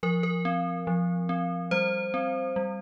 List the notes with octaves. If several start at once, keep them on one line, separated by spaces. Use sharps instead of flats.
F3 A#4
A#4
C4
F3
C4
G3 C5
C4
G3